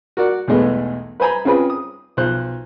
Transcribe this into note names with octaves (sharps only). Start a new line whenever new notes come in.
F#4 A#4 D5 F#5
B1 E2 G#3 A3 B3
B4 C5 G#5 A#5 B5
C4 C#4 F4 G#4 B4
D#6
B1 F3 C5 F#6